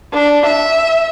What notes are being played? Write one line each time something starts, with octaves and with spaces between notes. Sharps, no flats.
D4
E5